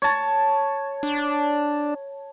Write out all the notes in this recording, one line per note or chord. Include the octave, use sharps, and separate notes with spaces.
C#5 A5
D4